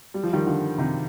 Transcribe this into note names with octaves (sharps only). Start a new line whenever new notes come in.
G3
F3
D#3 G3
D3 F3
C3 D#3